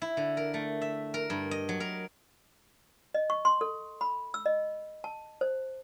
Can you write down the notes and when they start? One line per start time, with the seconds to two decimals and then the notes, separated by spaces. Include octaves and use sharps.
0.02 E4
0.17 D3
0.37 A#4
0.54 A3
0.82 E5
1.14 A#4
1.30 G2
1.51 D#5
1.69 F#3
1.80 A#4
3.14 D#5
3.30 C#6
3.45 C6
3.61 A4
4.01 B5
4.34 E6
4.46 D#5
5.04 A5
5.41 C5